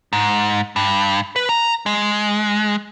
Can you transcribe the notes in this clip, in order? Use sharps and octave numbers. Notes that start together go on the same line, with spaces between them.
G#2
G2
B4
A#5
G#3